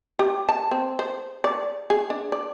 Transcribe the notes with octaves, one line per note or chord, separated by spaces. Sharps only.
G4
A5
C4
C5
D5
G#4
D4
D5